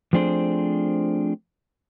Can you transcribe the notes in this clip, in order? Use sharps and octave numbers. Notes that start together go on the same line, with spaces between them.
F3 A3 C4 D4 G#4 C5